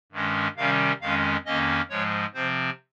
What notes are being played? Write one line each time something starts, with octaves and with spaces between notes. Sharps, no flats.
G2 D#3 G#3 C#4
C3 D#3 G3 C#4 F5
F2 D#3 G#3 C#4 F5
F2 D#3 A#3 C#4 D#5
G#2 F3 G#3 C#5
C3 F3 C4 C5